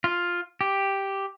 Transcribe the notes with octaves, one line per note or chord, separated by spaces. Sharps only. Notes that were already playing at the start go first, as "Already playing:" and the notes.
F4
G4